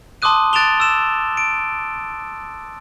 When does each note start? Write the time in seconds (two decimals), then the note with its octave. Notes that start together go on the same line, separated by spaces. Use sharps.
0.22 A5 C6 D6 D#6 F#6 D#7
0.53 F#6 A6 D7 E7 F7 G7
0.80 E6 E7
1.37 D7